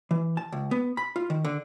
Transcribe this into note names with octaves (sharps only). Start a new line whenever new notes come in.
E3
A5
C#2
B3
B5
F4
D#3
D3